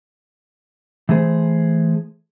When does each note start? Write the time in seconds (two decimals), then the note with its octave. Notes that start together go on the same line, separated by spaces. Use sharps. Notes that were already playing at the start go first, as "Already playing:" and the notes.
1.09 E3 A3 G#4 C5